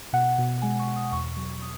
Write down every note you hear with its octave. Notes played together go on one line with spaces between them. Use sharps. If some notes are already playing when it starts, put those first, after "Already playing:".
B2 F#5
B2
G#3 G#5
C#6
B2
D#6
E2 C#6
F#3
D#6